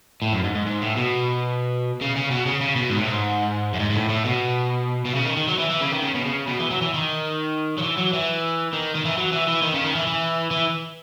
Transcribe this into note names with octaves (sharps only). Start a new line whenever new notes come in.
A2
F#2
G#2
G#2
G#2
A2
B2
C#3
C#3
B2
C#3
C#3
B2
G#2
A2
G#2
F#2
G#2
G#2
A2
A2
B2
B2
C#3
D#3
D#3
F#3
E3
E3
C#3
D#3
C#3
B2
C#3
B2
E3
F#3
E3
D#3
F#3
E3
F#3
E3
D#3
D#3
E3
F#3
E3
E3
D#3
C#3
D#3
E3
E3
E3